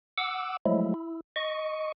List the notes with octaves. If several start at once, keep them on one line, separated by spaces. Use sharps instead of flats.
F#5 D6 E6
F3 F#3 G#3 A3 E4
E4
D#5 C#6